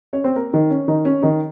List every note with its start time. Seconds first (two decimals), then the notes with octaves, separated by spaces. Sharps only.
0.13 C#4 C#5
0.24 C4 C5
0.36 A#3 A#4
0.53 D#3 D#4
0.70 C#4
0.88 D#3 D#4
1.05 C#4
1.22 D#3 D#4